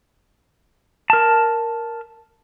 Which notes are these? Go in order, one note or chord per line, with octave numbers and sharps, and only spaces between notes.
A#4 A5